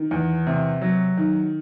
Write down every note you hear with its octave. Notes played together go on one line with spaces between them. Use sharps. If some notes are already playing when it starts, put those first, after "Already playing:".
Already playing: D#3
E2
C3
F#3
D#3